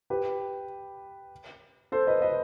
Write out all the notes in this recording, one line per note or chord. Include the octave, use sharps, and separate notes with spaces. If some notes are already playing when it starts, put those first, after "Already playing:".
G4 B4
A4 C5
B4 D#5
B4 D#5